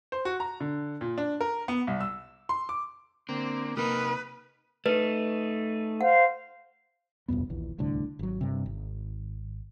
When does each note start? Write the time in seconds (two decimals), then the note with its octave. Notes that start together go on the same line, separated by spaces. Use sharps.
0.12 C5
0.25 F#4
0.40 A#5
0.60 D3
1.01 A#2
1.18 D4
1.41 A#4
1.68 B3
1.87 C2
2.01 E6
2.49 C6
2.69 D6
3.29 D3 A#3 C4
3.77 C3 A#3 D#4 B4 D#6 F6
4.86 A3 D#4 B4
6.01 C5 F5 F#5
7.28 D#1 C2 F2 B3
7.50 D#1 A#1 E3
7.78 D1 C2 A2 D3
8.19 G#1 F#3
8.41 G2 C3
8.66 G#1